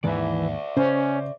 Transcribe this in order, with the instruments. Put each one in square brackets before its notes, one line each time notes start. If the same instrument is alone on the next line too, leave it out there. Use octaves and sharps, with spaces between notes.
[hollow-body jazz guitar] D#2 G#2 D#3 [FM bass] E3 [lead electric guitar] D5 E5
[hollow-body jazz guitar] C#3 [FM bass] C#4 [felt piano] C5